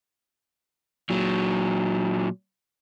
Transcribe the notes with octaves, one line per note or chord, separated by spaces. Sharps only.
A#2 F#3